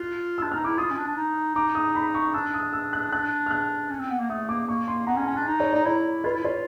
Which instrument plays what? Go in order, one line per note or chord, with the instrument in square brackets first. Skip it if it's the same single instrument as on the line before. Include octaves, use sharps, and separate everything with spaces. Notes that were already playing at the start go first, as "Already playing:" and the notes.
Already playing: [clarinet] F4 [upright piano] F#6
[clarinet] D4 [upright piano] E6
[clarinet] D#4 [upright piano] F6
[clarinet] E4 [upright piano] D6
[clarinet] F4 [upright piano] D#6
[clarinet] C#4
D4
D4
D#4
[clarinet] D#4 [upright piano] D6
[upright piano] D#6
B5
C#6
[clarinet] D4 [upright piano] E6
[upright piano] D#6
E6
F#6
[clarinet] D4 [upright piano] F#6
[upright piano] F6
F#6
[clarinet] C#4
C4
B3
A#3
[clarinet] A3 [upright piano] D#6
[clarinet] A#3 [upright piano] D6
[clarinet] A#3 [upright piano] C#6
[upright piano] C6
[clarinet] B3 [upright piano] A#5
[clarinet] C#4
[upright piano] A5
[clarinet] C#4
[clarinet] D4 [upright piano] G#5
[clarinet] D#4
[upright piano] C#5
[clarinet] D#4 [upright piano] D5
[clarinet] E4 [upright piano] C#5
[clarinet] F4 [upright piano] B4
[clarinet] E4
[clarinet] F4 [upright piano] C#5